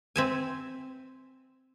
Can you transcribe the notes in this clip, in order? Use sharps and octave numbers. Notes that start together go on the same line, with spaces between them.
C4 E5 G#5